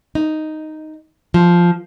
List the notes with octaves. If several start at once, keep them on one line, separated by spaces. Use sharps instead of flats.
D#4
F3